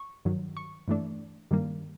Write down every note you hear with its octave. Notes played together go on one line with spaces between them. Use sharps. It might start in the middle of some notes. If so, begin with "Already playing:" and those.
Already playing: C#6
G2 D#3 F#3
C#6
G2 E3 A3 D4
G2 D#3 G3 A#3